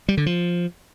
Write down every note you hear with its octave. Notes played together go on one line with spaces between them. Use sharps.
G3
D3
F3